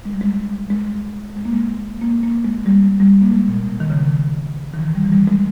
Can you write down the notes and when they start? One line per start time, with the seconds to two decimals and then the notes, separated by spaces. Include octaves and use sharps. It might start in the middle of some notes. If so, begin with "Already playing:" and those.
0.05 G#3
0.13 G3
0.21 G#3
0.70 G#3
1.36 G#3
1.45 A#3
1.53 G#3
2.01 A#3
2.23 A#3
2.45 G#3
2.66 G3
3.00 G3
3.22 A#3
3.32 G#3
3.48 A#2
3.64 B2
3.80 D#3
3.90 C#3
3.99 D#3
4.74 D#3
4.79 E3
4.95 G3
5.04 E3
5.12 G3
5.27 G#3